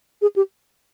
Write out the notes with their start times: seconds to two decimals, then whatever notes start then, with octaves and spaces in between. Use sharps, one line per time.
0.22 G#4
0.36 G4